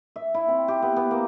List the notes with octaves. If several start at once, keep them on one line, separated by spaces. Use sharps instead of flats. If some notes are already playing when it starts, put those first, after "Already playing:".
E5
E4
C4
G4
B3
B3
A#3